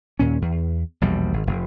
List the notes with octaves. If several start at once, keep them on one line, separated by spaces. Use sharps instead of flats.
D#2 A#2 C#4
E2
A#1 E2 B2 G3
G#1
F1